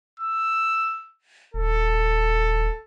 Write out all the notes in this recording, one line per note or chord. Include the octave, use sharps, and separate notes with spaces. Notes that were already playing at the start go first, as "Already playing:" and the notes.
E6
D#1 A4